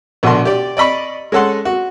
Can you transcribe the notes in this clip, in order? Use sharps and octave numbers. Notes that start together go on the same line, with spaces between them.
A#1 B2 D3 F#4 A5 C6
G4 D5
D5 D#5 B5 C#6
G#3 C#4 A4 F#5 C6
F#4